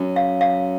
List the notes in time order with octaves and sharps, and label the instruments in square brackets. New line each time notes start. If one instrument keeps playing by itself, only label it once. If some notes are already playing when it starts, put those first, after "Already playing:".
Already playing: [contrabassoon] F#2
[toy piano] F5
F5